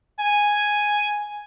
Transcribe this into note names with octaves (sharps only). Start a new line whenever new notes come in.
G#5